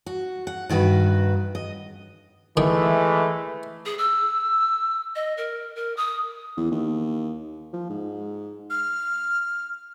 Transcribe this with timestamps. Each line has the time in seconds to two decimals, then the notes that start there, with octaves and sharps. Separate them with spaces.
0.06 F#4
0.47 F#5
0.69 G2 D#3 F#4 G4 B4
1.55 D#5
2.57 D#3 E3 G#3 A3
3.85 G#4
3.98 E6
5.15 D#5
5.37 A#4
5.76 A#4
5.97 D#6
6.57 E2
6.71 D#2
7.73 F3
7.90 G#2
8.70 F6